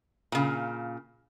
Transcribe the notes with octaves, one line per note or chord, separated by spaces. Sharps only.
A#2 C#3